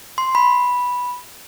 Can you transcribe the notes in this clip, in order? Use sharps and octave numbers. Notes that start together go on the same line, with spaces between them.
C6
B5